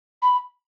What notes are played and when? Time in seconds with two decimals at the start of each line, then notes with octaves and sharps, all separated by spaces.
0.22 B5